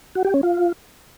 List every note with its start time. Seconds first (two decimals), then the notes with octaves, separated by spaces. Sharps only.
0.15 F#4
0.25 G4
0.34 C#4
0.43 F4